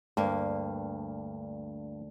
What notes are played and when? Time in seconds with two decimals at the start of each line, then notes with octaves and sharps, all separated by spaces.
0.17 D2 G2 A#3